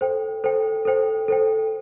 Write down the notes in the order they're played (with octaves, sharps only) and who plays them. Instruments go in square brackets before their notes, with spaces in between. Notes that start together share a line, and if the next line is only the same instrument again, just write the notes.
[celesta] A4 C5 G5
A4 C5 G5
A4 C5 G5
A4 C5 G5